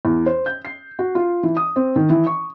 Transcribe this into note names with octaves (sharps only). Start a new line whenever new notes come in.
E2
C5
G6
C7
F#4
F4
E3
D#6
C4
D#3
E3
C#6